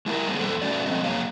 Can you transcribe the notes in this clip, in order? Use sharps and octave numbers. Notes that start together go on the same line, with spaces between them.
G#3 E4 A4 A#4
G3 A#3 C4 G#4
E2 A#2 F3 G3 A4 C5
G3 A3 C#4 F#4 D5
F3 G#3 A3 C4 D#5
F2 F#3 A#3 G#4 C#5 F5